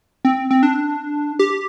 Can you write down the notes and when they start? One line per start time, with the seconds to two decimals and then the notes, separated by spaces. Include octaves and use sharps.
0.25 C4
0.51 C4
0.63 D4
1.39 G4